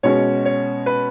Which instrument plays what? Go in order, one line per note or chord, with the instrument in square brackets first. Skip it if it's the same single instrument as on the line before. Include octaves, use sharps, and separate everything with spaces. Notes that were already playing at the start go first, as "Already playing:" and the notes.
[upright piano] B2 G#3 C#4 C#5
C#5
B4